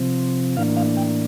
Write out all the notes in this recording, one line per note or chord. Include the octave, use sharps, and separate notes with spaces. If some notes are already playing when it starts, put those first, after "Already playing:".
Already playing: C3 F3 C4
A2 E3 A#3 D4 F5
F5
G5